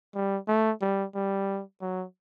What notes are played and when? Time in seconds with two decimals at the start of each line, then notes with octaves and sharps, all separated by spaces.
0.15 G3
0.48 A3
0.82 G3
1.15 G3
1.82 F#3